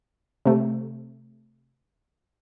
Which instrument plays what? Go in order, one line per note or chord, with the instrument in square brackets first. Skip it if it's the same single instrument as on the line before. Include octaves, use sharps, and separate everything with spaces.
[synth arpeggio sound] C3 A3